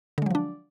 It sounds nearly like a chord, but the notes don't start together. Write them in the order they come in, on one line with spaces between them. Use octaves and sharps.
D3 G#3 F#3 F3 D4